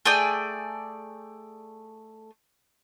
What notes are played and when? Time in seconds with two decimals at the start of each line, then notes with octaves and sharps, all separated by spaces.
0.05 A3 G#4 D5 G5